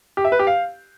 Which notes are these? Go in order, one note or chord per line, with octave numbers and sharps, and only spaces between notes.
G4
E5
B4
G4
F5